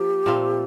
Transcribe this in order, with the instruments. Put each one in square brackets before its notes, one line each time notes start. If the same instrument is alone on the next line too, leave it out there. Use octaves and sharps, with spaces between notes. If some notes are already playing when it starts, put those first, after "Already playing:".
Already playing: [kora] F3 A#3 [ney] G4
[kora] A#2 A3 C4 F4